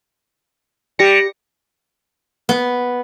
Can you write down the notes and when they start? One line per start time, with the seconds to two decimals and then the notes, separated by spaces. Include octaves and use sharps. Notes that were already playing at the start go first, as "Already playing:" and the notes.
0.99 G3 G4 A#6 C#7
2.49 B3